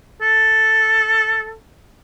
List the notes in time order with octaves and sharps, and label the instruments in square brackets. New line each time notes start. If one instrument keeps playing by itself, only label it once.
[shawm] A4